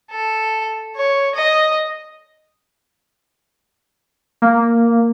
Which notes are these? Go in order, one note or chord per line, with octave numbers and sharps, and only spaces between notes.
A4
C#5
D#5
A#3